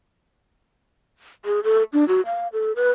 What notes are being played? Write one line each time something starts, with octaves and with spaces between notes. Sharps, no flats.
G#4
A4
D4
F#4
F5
A4
B4